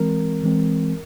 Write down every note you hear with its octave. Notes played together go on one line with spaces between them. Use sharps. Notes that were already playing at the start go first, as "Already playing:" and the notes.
Already playing: E3 G#3 C4 A#4
E3 G#3 C4